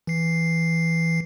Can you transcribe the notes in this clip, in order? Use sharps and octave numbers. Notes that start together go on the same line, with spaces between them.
E3 C7